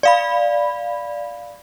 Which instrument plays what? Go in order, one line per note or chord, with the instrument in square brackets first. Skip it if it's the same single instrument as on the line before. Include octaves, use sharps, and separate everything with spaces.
[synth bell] D5 F5 B5